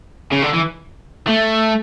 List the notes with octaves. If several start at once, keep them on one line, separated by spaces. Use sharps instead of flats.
C#3
D3
E3
A3